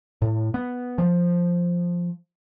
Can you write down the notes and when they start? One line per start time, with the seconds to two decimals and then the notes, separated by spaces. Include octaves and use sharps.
0.22 A2
0.54 B3
0.98 F3